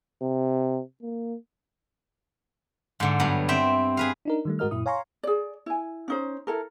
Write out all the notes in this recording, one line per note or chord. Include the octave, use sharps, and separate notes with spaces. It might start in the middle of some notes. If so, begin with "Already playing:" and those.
C3
A#3
G#2 D3
G2 F#3 B3
C4 E5 G5
G#4 B4 F5
D4 D#4 A#4
D#3 G3 A3
G#2 G#3 F#4 A#4 D#5 F6
F#2 A#2 E4 D#6
C#5 F5 G#5 A#5 C6 C#6
G#4 D5
E4 G#5
C#4 D#4 C5
E4 A4 A#4